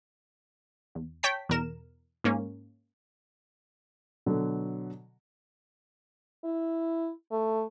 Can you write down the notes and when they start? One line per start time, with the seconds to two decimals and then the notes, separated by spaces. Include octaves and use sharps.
0.95 E2
1.23 C#5 G5 A5 B6
1.49 E2 B2 A#4 E7
2.24 G#2 A#3 C#4
4.26 B2 D3 F#3
6.44 E4
7.31 A3